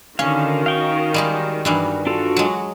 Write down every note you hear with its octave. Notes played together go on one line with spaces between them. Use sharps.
D3 D#3 C#4 F#4 F5
F5 G5 C#6
G3 G#3 G4
G2 E3 G3
D4 F4 F#4 A4
F#3 G#3